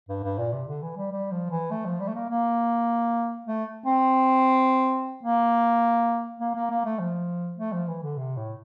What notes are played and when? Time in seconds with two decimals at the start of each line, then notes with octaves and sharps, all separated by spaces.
0.09 G2
0.23 G2
0.38 A#2
0.53 C3
0.68 D3
0.82 E3
0.97 G3
1.12 G3
1.31 F3
1.50 E3
1.71 A3
1.85 F3
2.00 G3
2.08 A3
2.15 A#3
2.29 A#3
3.47 A3
3.86 C4
5.23 A#3
6.41 A#3
6.55 A#3
6.70 A#3
6.85 A3
6.99 F3
7.58 A3
7.73 F3
7.88 E3
8.02 D3
8.17 C3
8.37 A2